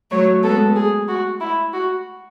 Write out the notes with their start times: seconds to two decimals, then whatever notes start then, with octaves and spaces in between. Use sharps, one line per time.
0.11 F#3 A3 C#5
0.43 G#3 B3 A4
0.76 G#4
1.08 F#4
1.41 E4
1.73 F#4